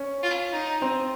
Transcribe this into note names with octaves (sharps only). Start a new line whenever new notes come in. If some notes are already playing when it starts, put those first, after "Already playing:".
Already playing: C#4
F4
D#4
C4